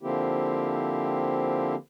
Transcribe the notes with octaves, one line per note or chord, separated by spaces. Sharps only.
D3 F3 A#3 C4 E4 G4